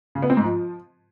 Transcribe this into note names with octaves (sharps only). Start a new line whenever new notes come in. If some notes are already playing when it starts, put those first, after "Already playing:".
C#3
B3
C4
G#2
F3